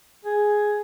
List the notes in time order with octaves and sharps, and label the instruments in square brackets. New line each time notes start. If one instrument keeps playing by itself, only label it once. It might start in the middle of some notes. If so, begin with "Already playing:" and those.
[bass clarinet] G#4